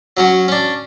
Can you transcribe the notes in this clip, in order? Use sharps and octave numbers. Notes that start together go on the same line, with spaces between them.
F#3 C#4 F#4
C#4 D4